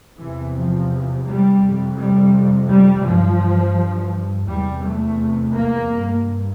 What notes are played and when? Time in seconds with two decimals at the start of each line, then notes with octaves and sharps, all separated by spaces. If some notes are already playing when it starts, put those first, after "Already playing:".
0.18 E2 C3 E3
0.55 F3
1.25 G3
1.62 F2 C3
1.98 G3
2.69 G3
3.05 G2 F3
4.48 E2 C3 G3
4.84 A3
5.55 A#3
5.91 G2